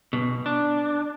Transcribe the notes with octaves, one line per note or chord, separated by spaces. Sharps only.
B1 B2
D4